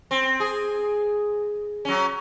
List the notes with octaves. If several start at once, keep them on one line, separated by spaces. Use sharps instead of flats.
C4
G#4
F#3 C#4